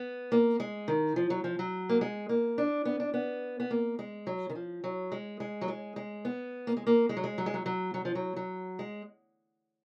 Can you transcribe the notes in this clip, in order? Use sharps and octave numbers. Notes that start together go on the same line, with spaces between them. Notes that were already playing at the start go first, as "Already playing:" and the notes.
Already playing: B3
A#3
G#3
D#3
F3
F#3
F3
F#3
A#3
G#3
A#3
D4
B3
D4
B3
B3
A#3
G#3
F#3
D#3
F3
F#3
G#3
G#3
F#3
G#3
G#3
B3
A#3
G#3
A#3
G#3
F#3
G#3
F#3
G#3
F#3
F#3
F#3
F3
F#3
F#3
G#3